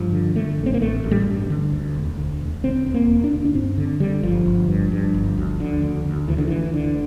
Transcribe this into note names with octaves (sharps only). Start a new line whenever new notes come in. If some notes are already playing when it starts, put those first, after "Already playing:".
Already playing: G2 F3
D3
D3 A3
A1
C4
A#3
A1 A3
A1
G3
G2
D3
D2
E1
D2
E1
D2 C4
E1
A#3
E1
D4
D2
D4
G2 C4
D3
D3 G3
G1 F3
G1
G2
G2
G1
D2
D3
D2
D2
D2 E3
D3
D2 E3
D2 D3